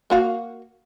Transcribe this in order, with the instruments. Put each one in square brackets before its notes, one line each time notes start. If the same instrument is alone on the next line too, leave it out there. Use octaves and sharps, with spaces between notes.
[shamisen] A#3 F#4 F5